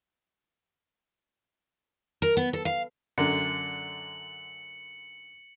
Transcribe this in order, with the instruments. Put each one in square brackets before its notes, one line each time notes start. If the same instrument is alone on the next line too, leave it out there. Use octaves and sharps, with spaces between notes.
[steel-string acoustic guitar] A#4
B3
A4
F5
[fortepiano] F#2 D3 [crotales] C#7 F#7